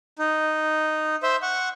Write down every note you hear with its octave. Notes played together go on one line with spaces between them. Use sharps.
D#4
C5 E5
F#5 C#6